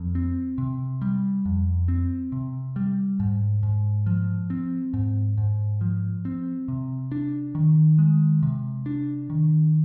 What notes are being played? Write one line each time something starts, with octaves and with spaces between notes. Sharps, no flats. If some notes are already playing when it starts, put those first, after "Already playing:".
Already playing: F2
C4
C3
G3
F2
C4
C3
G3
G#2
G#2
F3
C4
G#2
G#2
F3
C4
C3
D4
D#3
G#3
C3
D4
D#3